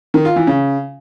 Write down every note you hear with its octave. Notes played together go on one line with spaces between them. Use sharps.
D#3
F4
E3
C#3